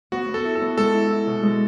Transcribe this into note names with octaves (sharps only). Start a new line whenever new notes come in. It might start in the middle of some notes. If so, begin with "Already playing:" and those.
B3 F#4
B3
A4
E4
A4
B3
G#3 A4
E4
E4
B2
G#3